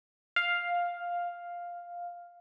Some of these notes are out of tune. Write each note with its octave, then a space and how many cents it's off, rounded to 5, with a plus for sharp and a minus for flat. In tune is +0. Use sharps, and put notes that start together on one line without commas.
F5 +5